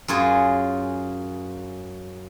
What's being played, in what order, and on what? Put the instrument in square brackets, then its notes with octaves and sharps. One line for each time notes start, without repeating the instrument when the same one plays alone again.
[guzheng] F#2 F4 G#4